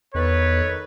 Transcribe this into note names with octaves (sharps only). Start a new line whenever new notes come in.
E2 D#3 A4 B4 C#5